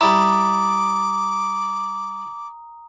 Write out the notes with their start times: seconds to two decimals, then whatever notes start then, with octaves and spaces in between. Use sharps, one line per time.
0.01 G3 E4 A#5 D6 D#6